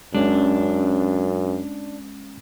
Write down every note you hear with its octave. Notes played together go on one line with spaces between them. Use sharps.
F#2 G#3 C#4 D4